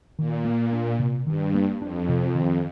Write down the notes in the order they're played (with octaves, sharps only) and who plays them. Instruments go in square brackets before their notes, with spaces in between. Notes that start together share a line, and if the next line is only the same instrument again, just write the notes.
[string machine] A#2 [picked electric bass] D#3
[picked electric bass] A#3
D4
C3
[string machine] G2 [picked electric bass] D#3
[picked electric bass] A#3
[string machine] F2 [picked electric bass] D4
[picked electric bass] C3
D#3